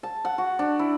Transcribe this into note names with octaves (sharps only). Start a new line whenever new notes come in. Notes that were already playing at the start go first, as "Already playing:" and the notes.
A5
F#5
F#4
D4
E4